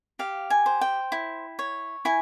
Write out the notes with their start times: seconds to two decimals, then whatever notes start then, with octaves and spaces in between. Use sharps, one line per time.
0.19 G4 F5
0.50 G#5
0.66 C5
0.81 G5
1.12 E4
1.59 C#5
2.05 E4 G#5